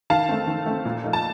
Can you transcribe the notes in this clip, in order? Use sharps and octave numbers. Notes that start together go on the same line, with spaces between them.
D#3 F5 A5
A3 C4
D#3
A3 C4
A#2
F3 A3 D#4
A5